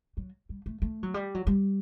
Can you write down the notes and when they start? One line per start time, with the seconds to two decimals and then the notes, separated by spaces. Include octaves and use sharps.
0.17 F#3
0.49 G3
0.66 A3
0.82 A3
1.03 F#3
1.14 G3
1.35 F#3
1.47 G3